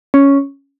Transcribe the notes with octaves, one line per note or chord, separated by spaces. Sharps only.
C#4